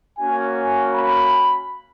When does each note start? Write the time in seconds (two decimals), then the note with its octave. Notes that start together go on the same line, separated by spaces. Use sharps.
0.18 A#3 C#4 F#4 G#5
0.94 B5